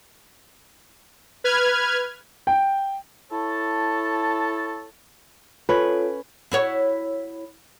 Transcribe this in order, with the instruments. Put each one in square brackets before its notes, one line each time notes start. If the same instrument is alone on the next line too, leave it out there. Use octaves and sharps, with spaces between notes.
[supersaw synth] B4 F6 G#6
[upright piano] G5
[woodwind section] E4 A4 C#5 A5
[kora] C#4 B4 [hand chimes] F4 A4 C#5
[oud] E4 F#4 C#5